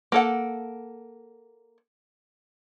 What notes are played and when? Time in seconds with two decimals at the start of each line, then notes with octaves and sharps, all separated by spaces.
0.12 A#3 A4 F#5